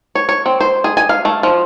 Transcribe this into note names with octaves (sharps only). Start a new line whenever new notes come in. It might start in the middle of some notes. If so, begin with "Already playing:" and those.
C#5
C#5
C4
C5
G#4
G#5
F5
A3
F3